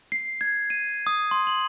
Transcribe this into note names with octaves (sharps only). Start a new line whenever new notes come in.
C7
G#6
D#7
D#6
C6
F#7